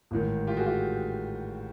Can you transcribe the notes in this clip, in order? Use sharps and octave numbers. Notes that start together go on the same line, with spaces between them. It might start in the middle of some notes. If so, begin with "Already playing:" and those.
A1 G#2 D#3
F4 G4
F#4 G#4
F4 G4